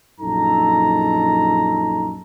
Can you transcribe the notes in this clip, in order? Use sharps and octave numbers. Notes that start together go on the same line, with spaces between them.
A#1 F#2 D#4 A4 A#5